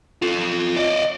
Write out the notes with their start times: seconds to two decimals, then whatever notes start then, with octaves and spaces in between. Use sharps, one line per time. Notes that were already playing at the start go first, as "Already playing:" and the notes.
0.22 F4 A4
0.76 D5 D#5